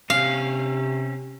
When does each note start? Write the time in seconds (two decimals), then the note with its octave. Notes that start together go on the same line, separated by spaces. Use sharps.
0.10 C3 C4 C#4 F5